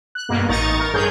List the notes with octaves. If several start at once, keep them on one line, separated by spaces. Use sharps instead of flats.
F#6
G2 B2 A#3
A1 D#4 A#5 C#6 A6
A#4
G2 G#4 C#5 G6